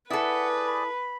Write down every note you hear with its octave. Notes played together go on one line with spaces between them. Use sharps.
E4 G#4 A4 B4 D5 F#5
B5